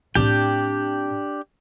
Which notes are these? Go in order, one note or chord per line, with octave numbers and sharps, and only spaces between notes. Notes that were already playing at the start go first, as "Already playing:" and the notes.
A2 C4 D4 G4 G5